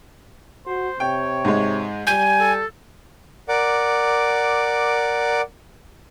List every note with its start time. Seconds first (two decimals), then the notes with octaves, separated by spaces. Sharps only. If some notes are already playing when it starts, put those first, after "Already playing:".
0.66 F#4 C5
1.00 C3 C#5 G5
1.45 G#2 G#3
2.07 G3 G#5 G6 D#7
2.40 A4
3.49 A#4 D5 F#5 D6